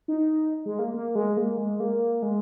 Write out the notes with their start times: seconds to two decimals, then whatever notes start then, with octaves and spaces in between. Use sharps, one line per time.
0.08 D#4
0.65 G#3
0.79 A#3
0.94 A#3
1.15 G#3
1.37 A#3
1.58 G#3
1.80 A#3
2.23 G#3